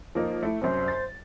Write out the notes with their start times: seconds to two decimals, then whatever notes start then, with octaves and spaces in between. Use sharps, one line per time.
0.15 F3 A#3 D#4
0.43 A3 E4
0.61 C2 F#2 C5
0.88 A6